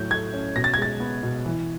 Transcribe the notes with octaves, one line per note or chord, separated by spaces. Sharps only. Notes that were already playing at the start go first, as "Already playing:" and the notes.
Already playing: A2 F#3 G6
A3 G#6
C#4
B2 A#6
A6
G#6
G#3 A6
B3
B2
E3